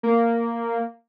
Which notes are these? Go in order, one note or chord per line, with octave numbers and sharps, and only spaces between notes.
A#3